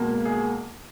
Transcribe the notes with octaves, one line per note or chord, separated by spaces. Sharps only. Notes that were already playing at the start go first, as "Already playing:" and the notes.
Already playing: C#2 B2 A#3
G#4